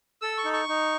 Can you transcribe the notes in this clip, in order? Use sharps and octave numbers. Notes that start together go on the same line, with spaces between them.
A4 E6
C#6
D#4
C#6
D#4